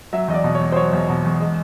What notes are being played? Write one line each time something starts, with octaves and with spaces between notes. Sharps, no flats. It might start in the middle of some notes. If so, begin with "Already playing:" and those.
F#3 E5
E2 D#5
D5
B2
C#5
E2
C5
F#3 C#5
E2
B2
E2
G#3